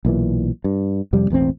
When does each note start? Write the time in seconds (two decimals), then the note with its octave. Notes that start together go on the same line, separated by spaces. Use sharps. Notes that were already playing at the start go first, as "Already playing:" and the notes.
0.05 B1 A#2 E3
0.64 G2
1.13 F2 C3 G3
1.30 E1 A1 A#3 C4